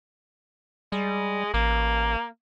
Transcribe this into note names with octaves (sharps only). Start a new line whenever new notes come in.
G3 G#3
A1 A#3